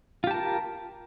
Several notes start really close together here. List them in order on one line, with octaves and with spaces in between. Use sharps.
F4 G4 A5 A#4